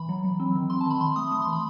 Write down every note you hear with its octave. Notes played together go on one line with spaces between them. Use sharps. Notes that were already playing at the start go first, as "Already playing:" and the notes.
Already playing: E3 B5
F#3
F#3
C4
D#3
C4 C6
A5
D#3 B5
D#3 C6
A3 D#6
A3 D#6
C6
E3
B5